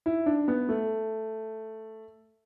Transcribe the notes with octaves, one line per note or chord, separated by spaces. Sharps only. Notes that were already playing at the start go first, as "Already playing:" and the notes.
E4
D4
B3
A3